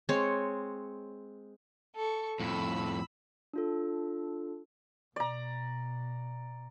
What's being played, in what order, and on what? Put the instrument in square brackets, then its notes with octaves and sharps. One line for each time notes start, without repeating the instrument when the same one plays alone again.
[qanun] G#3 C4 C#5
[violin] A4 C#6
[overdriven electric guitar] F2 A2 [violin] B5 E6
[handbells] D4 F4 A4
[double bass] B2 [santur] D5 A#5